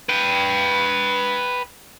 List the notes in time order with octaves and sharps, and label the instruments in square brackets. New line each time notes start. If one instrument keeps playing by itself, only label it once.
[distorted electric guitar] B4 G5